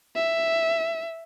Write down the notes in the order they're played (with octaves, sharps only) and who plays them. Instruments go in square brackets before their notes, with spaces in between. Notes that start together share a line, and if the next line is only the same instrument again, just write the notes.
[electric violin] E5